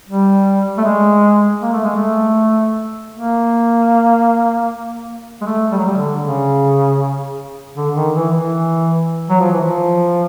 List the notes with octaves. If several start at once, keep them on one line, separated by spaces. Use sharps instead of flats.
G3
A3
G#3
A#3
A3
G#3
A3
A#3
G#3
A3
G3
F#3
G3
D3
C#3
D3
D#3
E3
E3
F#3
F3
E3
F3